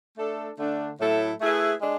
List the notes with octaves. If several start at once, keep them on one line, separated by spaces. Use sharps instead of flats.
A3 D4 A4
D3 A3 D4
A2 F#3 A3 E4 A4
A3 E4 G#4 B4 E5
G#3 D4